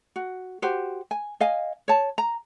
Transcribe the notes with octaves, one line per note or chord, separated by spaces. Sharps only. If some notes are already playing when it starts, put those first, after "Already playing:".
F#4
F#4 G4 C5
G#5
D#5 F5 G#5
C#5 A5
A#5